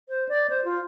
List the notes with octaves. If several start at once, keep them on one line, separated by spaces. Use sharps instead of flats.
C5
D5
C5
F4